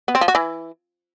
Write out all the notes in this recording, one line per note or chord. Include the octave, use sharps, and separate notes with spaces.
B3
C4
F3
F#4
E3